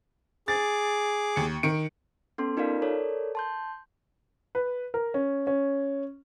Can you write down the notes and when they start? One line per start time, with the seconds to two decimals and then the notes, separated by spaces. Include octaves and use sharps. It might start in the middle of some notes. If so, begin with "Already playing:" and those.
0.48 G#4 D6 A6
1.36 D#2 C#7
1.63 D#3 C#7 D7
2.38 B3 C#4 A4 C6
2.57 D#4 F4 A#4 D5 F5
2.82 A4 A#4 C#5 D5
3.35 A5 C6 G6
4.55 B4
4.94 A#4
5.14 C#4
5.47 C#4